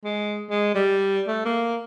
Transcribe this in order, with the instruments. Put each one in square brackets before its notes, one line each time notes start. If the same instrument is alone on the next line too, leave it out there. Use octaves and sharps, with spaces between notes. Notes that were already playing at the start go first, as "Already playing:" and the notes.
[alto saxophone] G#3
G#3
G3
A3
A#3